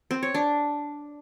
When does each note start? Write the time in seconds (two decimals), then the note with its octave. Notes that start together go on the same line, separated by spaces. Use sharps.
0.11 C4
0.23 C#5
0.34 D4